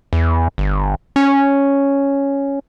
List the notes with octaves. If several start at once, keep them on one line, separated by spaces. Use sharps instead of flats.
E2
G1
C#4